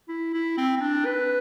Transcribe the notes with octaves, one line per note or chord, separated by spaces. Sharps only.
E4
E4
C4
C4
D4
B4